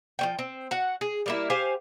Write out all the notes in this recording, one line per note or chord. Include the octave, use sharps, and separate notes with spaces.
F3 C#4 G5
C4
F#4 F#5
G#4
G3 A#3 E4
G4 C5 F5 G#5